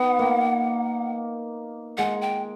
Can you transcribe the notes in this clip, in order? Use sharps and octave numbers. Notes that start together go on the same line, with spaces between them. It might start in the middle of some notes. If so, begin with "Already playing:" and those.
Already playing: B3 D#4 F#5
A#3
G#3 F#5
G5